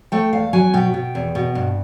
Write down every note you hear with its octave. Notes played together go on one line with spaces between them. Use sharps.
A3 G5
E2 F5
F#3 G#5
B2 G5
B2
E2
B2
G2